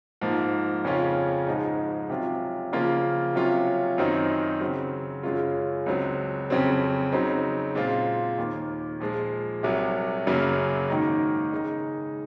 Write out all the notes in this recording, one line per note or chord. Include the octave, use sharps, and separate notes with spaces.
G#2 F3 A#3
F2 C#3 G#3 C#4 F4
G#2 F3 G#3 D#4
C3 F#3 C#4 F4
C#3 F3 A#3 F4
C3 F#3 C#4 F4
F#2 D#3 F#3 C4 D#4
C#3 F#3 C4
F#2 C#3 G#3 C#4 F4
C#2 C#3 F#3 C4
F2 C#3 F#3 C4
C#3 F#3 C4 D#4
A#2 G#3 C4 F4
D#2 D#3 A#3
A#2 F3 G#3
C2 C3 F#3
F#2 C#3 F#3 A#3
G#2 D#3 A#3 D#4
C#3 G#3 D#4